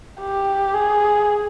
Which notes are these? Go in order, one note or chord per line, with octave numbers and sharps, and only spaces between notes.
G4
G#4